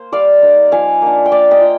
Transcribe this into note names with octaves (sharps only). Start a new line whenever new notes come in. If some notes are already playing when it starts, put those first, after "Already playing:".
Already playing: A#3 C5
G3 D5 F5
A#3 D#4
F3 F5 G#5
A#3 D4
G5
A#3 D5 F5
D#5 G5
F4